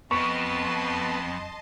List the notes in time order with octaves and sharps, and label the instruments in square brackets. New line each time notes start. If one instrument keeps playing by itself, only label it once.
[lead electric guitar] F2 [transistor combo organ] B3 [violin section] D#5 A5 C6 [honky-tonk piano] C#6